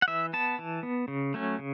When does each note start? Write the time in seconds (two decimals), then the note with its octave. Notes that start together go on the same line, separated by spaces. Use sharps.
0.02 F#5
0.08 E3 E5
0.33 B3 A5
0.59 E3
0.83 B3
1.08 C#3
1.34 F#3 A3 C#4
1.59 C#3